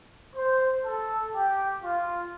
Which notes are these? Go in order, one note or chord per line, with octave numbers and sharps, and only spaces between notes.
C5
A4
G4
F4